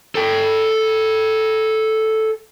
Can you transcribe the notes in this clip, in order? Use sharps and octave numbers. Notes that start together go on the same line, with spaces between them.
A4 G5